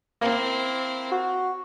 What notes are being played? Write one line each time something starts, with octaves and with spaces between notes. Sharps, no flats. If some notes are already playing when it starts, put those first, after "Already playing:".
A#3 C4 E4
F#4